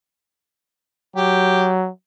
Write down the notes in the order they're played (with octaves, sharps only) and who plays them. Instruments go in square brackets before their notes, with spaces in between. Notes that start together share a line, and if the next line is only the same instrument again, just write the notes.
[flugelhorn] F#3 [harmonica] G4